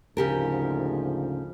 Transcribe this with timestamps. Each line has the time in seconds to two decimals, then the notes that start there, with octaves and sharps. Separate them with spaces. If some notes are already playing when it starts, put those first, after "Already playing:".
0.17 D2 G#2 C#3 F3 G4 A#4